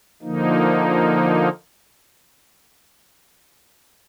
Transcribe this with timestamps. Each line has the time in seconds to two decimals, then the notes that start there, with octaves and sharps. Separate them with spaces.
0.22 D3 F3 A#3 D#4